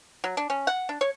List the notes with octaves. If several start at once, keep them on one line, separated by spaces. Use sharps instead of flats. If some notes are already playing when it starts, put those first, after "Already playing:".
F#3
D4
C#4
F#5
D4
C#5